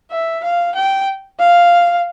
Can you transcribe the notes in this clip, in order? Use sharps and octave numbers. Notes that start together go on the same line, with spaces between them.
E5
F5
G5
F5